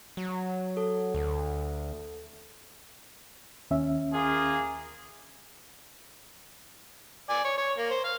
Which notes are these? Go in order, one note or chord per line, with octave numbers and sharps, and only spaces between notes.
F#3
A4
D2
D#2 C#4 E5
A#3 F4 G#4
D5 G#5
C#5
C#5
A#3
C5
F5